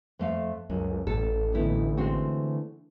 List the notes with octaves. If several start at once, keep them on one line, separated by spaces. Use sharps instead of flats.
F2 A3 F5
C#2 F#2
A1 A4
D3 E3 A3 B3 D#4 E4
G#3 C4 F#4